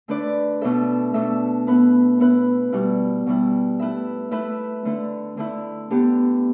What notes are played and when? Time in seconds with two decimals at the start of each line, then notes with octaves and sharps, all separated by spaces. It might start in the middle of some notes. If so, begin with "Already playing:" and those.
0.08 D3 A3 D4 B4 D5
0.62 B2 A3 D4 A4 E5
1.14 B2 A3 D4 A4 E5
1.67 B3 E4 B4
2.20 B3 E4 B4
2.72 B2 G3 E4
3.27 B2 G3 E4
3.79 A3 E4 B4 E5
4.31 A3 E4 B4 E5
4.85 D3 A3 E4
5.37 D3 A3 E4
5.90 D3 B3 D4 G4